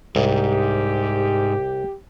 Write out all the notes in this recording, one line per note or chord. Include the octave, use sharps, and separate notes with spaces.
C2 G#2 G4